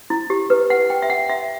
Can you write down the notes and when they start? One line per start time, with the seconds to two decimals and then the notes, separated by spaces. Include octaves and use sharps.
0.10 E4
0.30 G4
0.50 B4
0.70 F#5
0.90 G5
1.02 E5
1.10 F#5
1.29 E5